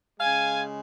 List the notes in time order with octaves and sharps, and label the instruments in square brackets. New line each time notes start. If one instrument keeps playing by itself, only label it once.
[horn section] C#3 G#3 F5 G#5